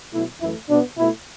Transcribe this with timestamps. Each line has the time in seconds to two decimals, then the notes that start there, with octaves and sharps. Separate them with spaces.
0.13 B2 F#3 A3 E4
0.41 F#2 E3 A3 E4
0.70 B2 B3 D4
0.98 B2 A3 E4